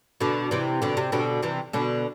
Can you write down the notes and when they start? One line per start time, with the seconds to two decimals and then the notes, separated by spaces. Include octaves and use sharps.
0.21 B2 D3
0.51 C3 E3
0.82 B2 D3
0.97 C3
1.12 B2 D3
1.42 C3 E3
1.73 B2 D3